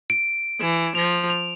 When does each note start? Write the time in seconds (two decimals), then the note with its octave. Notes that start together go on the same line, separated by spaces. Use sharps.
0.10 D7
0.61 E3 E7
0.95 F3 F7
1.30 F7